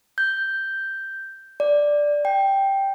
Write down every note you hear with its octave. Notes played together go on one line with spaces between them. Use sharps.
G6
D5
G5